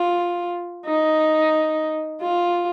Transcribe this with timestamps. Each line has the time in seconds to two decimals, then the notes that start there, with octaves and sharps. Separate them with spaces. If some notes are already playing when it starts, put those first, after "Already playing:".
Already playing: F4
0.86 D#4
2.21 F4